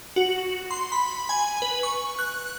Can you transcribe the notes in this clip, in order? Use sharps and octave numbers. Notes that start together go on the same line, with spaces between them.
F#4
C6
B5
G#5
B4
C#6
F#6